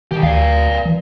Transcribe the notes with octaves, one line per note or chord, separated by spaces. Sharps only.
B1 D#3 G4
D2 D5 F5
E3